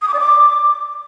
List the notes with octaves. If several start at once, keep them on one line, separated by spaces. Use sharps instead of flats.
D#6
D6
D5
D6